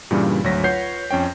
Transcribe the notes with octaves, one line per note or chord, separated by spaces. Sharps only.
G2 A#2 C#3 E3 G3
G#1 D2 F#3 C#5 A#6 B6
F4 B4 C#5 F#5 G6 C7
F2 C#4 C#5 G5